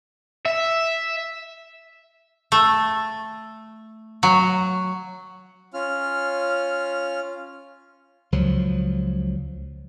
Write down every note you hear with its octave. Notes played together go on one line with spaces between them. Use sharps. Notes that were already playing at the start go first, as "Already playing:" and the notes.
E5
A3
F#3
C#4 F4 F6
C#2 F3 F#3